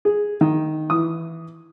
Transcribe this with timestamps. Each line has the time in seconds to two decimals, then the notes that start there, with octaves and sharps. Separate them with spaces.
0.05 G#4
0.41 D#3
0.90 E3 D#6